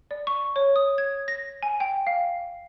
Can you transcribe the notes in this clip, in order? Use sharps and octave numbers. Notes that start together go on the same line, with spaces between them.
D5
C#6
C#5
D#6
G#6
A#6
G#5
G5
F5